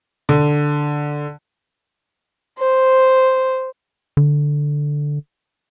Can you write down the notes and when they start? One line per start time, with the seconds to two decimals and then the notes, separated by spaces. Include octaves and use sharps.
0.29 D3
2.59 C5
4.17 D3